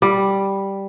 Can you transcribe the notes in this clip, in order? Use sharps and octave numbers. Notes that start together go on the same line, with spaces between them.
G3